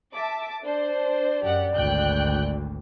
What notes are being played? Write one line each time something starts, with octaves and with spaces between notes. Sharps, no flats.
E5 A5 D6
D4 C5 D5
F#2 G4 F#5
G#1 D2 G5 F#6 G6